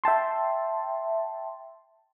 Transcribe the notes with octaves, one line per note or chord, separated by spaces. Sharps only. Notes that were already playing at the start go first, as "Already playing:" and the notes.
E5 G5 A5 C6